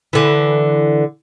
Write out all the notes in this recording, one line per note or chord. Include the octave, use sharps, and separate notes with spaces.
D3 E3